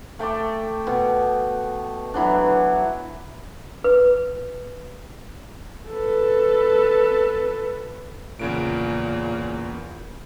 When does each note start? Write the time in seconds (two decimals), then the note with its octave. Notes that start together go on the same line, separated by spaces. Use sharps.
0.19 A3 G5 A5 D6
0.87 B2
2.14 E3 F#3 D4
3.84 B4
5.89 A4 B4
8.39 E2 A#2 C#3 D7